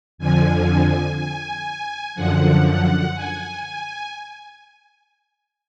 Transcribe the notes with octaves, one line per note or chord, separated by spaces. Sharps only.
F2 D3 F3 G#5
G#5
F#2 D3 F3 F#5
F#5
G#5
G#5